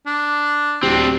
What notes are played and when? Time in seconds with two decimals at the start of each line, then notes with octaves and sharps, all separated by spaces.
0.06 D4
0.83 D1 C4 D4 G4